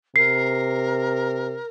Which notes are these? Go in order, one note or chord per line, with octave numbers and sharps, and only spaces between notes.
C3 A#4 C7